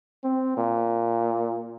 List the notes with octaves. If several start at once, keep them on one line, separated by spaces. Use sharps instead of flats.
C4
A#2